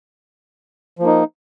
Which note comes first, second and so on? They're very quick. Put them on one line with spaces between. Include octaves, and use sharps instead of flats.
F3 A#3 D#4